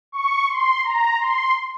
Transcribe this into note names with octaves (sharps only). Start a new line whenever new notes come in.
C#6
C6
A#5
C6